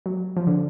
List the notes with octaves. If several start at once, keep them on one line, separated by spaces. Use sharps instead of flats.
F#3
F3
D3